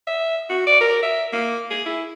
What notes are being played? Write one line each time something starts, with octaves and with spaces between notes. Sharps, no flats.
E5
F#4
D5
A#4
E5
A#3
G#4
E4